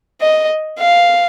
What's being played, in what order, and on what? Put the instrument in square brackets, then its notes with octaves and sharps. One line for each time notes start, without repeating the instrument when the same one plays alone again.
[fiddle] D#5
F5